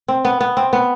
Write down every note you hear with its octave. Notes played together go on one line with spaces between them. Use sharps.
C4
B3
B3
C4
B3